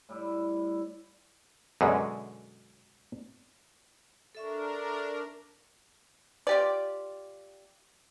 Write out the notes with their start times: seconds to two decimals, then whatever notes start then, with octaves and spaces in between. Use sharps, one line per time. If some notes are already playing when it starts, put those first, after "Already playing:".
0.09 A2 G3 E4
1.81 F#2 B2 D3 G#3
4.35 D4 A4 A#4 E5 C#6
6.47 F4 G4 D5